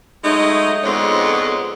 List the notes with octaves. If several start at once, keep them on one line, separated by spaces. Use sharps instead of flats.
F#3 G#3 A3 D#4
F2 G#2 D3 G#3 B3 C#5